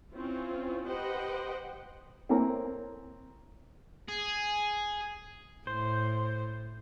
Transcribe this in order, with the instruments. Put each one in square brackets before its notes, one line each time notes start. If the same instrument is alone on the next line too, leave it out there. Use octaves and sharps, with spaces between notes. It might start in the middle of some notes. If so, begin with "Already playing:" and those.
[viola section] C4 C#4 E4 F4
G4 B4 C5 D#5 F#5 G5
[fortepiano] C4 E4 A#4 C#5 A#5
[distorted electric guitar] G#4
[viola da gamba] A2 [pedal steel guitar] C5